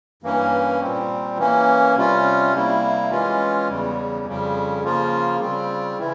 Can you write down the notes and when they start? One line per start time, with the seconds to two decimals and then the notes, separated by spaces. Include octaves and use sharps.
0.23 G2 E3 A#3 C#4
0.80 A#2 G3 C4
1.38 E3 A#3 C#4
1.96 C3 G3 C#4 F4
2.53 C3 G3 A#3 E4
3.11 E3 G#3 C#4 F4
3.69 E2 C#3 G3
4.26 F2 C#3 G3
4.84 C#3 F3 A#3 F4
5.41 C#3 G3 C4 F4
5.99 C#3 E3 E4